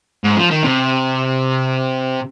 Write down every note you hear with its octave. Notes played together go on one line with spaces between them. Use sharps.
G#2
F3
D#3
C3